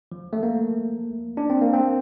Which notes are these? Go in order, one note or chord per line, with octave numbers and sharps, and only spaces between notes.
F3
A3
A#3
D4
C4
A#3
C4